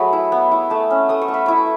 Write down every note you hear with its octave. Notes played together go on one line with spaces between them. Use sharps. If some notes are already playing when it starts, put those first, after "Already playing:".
Already playing: F#3 A3 F#4 G#4 B4 C#5
E4
B3
E4
A3 A5
C#4
A3 D#6
C#6
A3
B5
E4 C#6